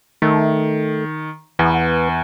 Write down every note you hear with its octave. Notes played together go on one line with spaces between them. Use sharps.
D#3 A3
E2 B3